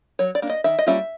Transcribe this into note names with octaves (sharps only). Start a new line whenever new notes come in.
F#3 C#5
D5
A#3 D4
D#5
D#3 E5
D#5
G3 A#3 C#4 F4 E5